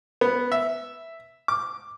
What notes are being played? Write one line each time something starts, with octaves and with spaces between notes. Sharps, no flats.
B3
E5
D6